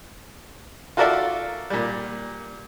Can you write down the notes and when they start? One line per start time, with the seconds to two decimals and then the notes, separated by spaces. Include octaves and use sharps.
0.97 F4 F#4 A4 A#4 D5 E5
1.70 A#2 G3